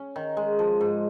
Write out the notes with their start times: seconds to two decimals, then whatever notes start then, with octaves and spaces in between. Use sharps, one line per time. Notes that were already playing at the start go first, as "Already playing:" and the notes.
Already playing: C#4
0.16 D#3
0.37 G#3
0.59 F3
0.81 G#2